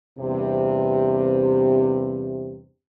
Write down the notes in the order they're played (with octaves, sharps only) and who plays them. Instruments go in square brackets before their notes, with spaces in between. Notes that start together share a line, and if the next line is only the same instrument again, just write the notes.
[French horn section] E2 G2 C3